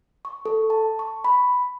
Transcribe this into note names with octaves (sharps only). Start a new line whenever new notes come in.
C#6
A4
A5
C#6
B5